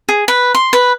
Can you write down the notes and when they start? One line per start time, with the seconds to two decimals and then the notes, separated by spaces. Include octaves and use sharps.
0.09 G#4
0.28 B4
0.55 C6
0.73 B4